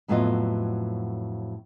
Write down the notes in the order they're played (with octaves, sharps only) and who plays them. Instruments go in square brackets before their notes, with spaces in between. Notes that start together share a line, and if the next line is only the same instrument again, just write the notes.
[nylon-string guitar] F2 A2 F#3 B3 F4 D#5